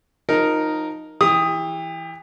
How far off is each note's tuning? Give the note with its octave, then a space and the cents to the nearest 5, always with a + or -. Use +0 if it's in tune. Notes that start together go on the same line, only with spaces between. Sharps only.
F3 +35 D#4 +0 A#4 +0
E3 +0 G4 +30 D#6 +0